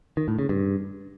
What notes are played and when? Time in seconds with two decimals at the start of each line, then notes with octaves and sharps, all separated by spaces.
0.17 D#3
0.28 A2
0.39 C#3
0.49 G2